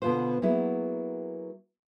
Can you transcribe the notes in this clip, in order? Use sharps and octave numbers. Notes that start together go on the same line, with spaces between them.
B2 D3 B3 F4 B4 C5
F#3 A#3 B3 E4 G#4